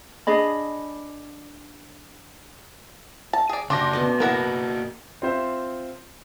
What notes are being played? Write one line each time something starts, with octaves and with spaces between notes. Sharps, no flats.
D4 G#4 D#5 B5
A5
G#4 D5
C#3 D4 F#4 G5 C6 D6 A#6
B2 A3 D#5
A#3 B3 E4 F#4 A#4 F#5 A#6
C4 F4 C5 E5